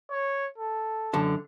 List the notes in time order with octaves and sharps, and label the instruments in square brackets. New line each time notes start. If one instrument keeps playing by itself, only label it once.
[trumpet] C#5
A4
[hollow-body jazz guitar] F#2 D3 A5